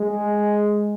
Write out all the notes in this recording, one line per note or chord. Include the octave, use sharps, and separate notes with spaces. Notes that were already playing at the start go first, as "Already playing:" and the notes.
Already playing: G#3